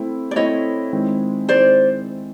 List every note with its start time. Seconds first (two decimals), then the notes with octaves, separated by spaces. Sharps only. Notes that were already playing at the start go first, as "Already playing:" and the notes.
Already playing: A3 C4 E4
0.31 D5
0.36 A3 C4 E4 C#5 D#5
0.93 D#3 G#3 C4 E4 G#4
1.48 D#3 G#3 C4 E4 G#4 C5 D5